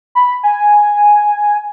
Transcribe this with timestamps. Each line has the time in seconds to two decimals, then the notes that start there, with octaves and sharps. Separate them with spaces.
0.15 B5
0.43 G#5